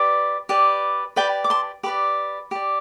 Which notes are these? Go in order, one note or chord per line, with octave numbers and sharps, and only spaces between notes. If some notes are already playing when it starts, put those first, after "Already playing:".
Already playing: G4 B4 D5
G4 B4 D5
G4 B4 D5 G5 B5
D6
A5 C6
G4 B4 D5 B5 D6
G4 D5